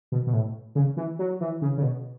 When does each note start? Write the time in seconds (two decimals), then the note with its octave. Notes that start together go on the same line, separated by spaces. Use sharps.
0.12 B2
0.27 B2
0.33 A2
0.75 C#3
0.97 E3
1.19 F#3
1.41 E3
1.62 C#3
1.78 C#3
1.83 B2